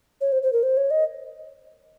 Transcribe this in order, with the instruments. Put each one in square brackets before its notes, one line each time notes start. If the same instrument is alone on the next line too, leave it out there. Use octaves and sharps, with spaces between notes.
[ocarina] C#5
C5
C5
A#4
C5
C#5
D#5